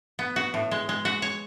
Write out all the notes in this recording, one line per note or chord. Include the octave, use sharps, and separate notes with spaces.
B3
F#4
A2
G#3
G#3
F#4
C#5